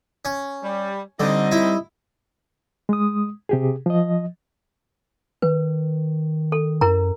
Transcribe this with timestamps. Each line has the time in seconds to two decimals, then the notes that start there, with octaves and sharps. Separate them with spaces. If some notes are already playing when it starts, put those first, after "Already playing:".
0.25 C#4
0.63 G3
1.20 D3 G3 C4 D#4 D#5
1.52 E4
2.89 G#3 D#6
3.49 C3 G4 G#4
3.86 F3 D#5
5.42 D#3 B4
6.52 A4
6.81 F#2 E4 A#4 A#5